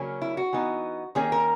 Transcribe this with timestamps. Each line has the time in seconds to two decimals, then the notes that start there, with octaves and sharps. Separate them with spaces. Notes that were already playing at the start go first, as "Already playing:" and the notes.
Already playing: C#3 F#3 A#3 C#4
0.22 E4
0.37 F#4
0.53 E3 B3 D#4
1.15 D#3 A#3 C#4 G#4
1.32 A#4